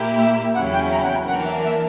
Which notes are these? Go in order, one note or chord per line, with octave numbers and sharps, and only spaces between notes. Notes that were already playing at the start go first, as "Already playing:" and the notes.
Already playing: A#2 A#3 E4 G4
E5
E2 C#3 F#3 C#4 E4 F#5
G5
A#5
F#5
G5
E3 A#3 D4 A#4 F#5
E5
E5